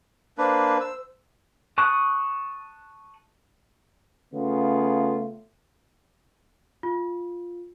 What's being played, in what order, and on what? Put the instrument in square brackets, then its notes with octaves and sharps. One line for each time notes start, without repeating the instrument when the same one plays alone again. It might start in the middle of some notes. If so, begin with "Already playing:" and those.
[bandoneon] A#3 D4 B4 [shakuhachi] C5
[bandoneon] E6
[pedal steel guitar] A5 C#6 D#6 F#6
[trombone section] C#3 A3 B3 F4
[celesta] F4